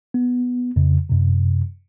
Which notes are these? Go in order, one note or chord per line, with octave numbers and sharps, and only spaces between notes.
B3
F2 C#3
F#2 C3